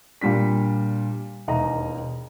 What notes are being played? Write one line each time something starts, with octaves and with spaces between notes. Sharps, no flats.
A#2 G3 D4 B6
E1 D#2 D#5 A#5